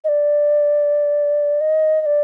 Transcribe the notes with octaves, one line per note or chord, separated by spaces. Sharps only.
D#5
D5
D#5
D#5
D5